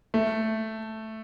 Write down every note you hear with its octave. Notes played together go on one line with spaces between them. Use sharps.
A3